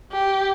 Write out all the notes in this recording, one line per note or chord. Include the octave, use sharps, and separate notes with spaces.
G4